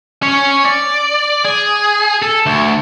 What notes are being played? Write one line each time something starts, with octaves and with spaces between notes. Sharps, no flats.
C#4 C#5
D5
G#4
A4
D2